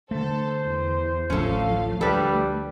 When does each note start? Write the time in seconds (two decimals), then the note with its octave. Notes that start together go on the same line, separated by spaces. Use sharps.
0.11 D3 A3 A4 C5
0.63 E2
1.30 D1 A1 F3 A3 C#4 A4 F5
2.01 D2 F3 G3 A4 B4